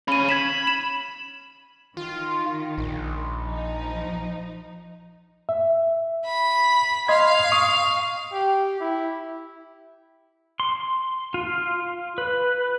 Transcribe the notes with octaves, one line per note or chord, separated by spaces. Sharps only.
C#3 C#4 B5 D#7
B5 G#6 B6 E7
E7
D#3 F4
A#1
F3 D#4
E5
B5
D#5 F5 C6 G#6
C#6 D#6
G4
E4
C6
F4
B4